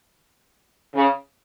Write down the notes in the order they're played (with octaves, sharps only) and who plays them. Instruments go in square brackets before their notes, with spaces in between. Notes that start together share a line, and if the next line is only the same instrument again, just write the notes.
[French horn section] C#3